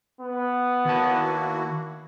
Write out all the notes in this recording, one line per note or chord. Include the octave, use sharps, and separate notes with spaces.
B3
D#3 A#3 E4 F#4 A5